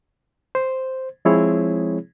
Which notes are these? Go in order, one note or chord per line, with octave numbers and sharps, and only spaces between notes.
C5
F3 G#3 C4 E4 G#4 C#5